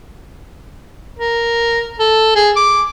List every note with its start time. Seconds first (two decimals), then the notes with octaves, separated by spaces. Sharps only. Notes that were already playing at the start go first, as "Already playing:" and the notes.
1.19 A#4
1.99 A4
2.36 G#4
2.56 D6